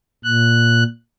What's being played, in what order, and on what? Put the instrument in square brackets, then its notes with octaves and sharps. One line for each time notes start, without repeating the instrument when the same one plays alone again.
[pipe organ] A#2 F#6